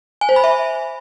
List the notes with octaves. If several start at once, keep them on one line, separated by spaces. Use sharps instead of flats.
G#5
C5
B5
E5